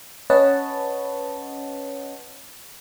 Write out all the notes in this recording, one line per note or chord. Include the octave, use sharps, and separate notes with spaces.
C#4 B4 C#5 D#5 F#5 A5